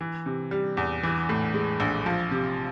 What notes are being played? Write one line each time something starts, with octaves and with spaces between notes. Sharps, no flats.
E3
C3
G3
E2
E3
A2
G#3
A#1
F3
C3